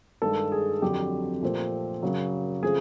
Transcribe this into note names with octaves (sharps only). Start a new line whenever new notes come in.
G2 D#3 G#3 A4
G#4
F2 D3 F#3 G4
A#2 F3 A3 C4
F#2 C#3 F#3
C#3 F3 A3 C4 G#4